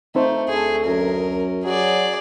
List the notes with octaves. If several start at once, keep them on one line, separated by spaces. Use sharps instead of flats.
A3 C4 D#4 C5
D2 A3 G#4
F#2 A#4
F#3 G#4 D5